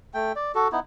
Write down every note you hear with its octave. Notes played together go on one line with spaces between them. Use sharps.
A3 G5
D5
F#4 A4
B3 D#4 E4